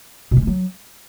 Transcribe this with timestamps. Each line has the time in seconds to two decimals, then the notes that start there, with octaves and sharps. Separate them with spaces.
0.31 B2
0.37 C#4
0.42 G#3
0.47 F#3